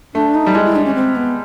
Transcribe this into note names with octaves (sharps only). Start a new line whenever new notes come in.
A3 D4
D#4
G3
G#3 E4
E4
D4
C#4
C4
B3